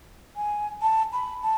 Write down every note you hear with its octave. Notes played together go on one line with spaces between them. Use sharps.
G#5
A5
B5
A5